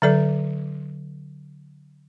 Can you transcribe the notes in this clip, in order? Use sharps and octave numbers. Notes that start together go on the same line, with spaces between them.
D3 F#3 A4 D5